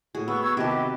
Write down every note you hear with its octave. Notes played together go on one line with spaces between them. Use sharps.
A2 F#4 G#4
B3 C#6 E6
C#6 E6 G#6
C3 D#3 F#4 G4 B4 D#5 A5